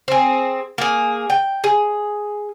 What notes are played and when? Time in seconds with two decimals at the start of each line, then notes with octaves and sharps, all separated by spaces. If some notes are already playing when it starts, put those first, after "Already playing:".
0.08 C4 G#4
0.78 A#3 G#4
1.30 G5
1.64 G#4